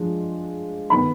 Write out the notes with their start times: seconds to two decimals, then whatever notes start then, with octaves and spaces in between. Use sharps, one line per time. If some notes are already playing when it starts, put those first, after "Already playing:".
Already playing: F3 G#3 D4
0.90 D#3 B3 B5